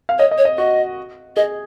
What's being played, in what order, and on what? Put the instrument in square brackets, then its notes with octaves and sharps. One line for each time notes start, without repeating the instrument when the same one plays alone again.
[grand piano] F5
[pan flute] C#5 [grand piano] D#5
[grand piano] D#5
[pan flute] C#5
[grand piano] D#5
[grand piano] F#4 [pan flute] D#5
[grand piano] G#4 [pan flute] D#5